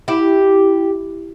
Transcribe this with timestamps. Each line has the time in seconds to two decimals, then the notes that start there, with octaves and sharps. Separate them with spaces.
0.08 E4 G4